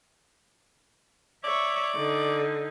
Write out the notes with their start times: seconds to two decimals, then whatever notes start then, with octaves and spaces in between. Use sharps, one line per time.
1.44 C#5 D5 E5
1.94 D3 D#4